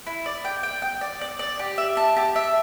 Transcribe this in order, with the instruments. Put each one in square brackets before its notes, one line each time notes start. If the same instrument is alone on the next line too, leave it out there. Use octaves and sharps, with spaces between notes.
[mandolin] E4
D5
G5
G5
G5
D5
D5
D5
G4
E5
A5
G4
E5